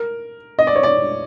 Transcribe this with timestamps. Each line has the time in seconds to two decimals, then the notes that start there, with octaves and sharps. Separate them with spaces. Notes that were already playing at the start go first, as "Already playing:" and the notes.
Already playing: A#4
0.59 D#5
0.67 D5
0.76 C#5
0.83 D5